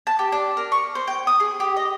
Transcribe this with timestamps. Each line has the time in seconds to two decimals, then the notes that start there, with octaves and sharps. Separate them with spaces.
0.07 A5
0.19 G4
0.32 D4
0.57 A#4
0.72 C#6
0.95 C5
1.07 G5
1.27 D#6
1.40 G#4
1.60 G4
1.76 D#5